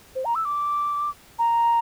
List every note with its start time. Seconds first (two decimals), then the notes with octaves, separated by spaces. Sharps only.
0.15 C5
0.25 A#5
0.35 E6
0.45 D6
1.39 A#5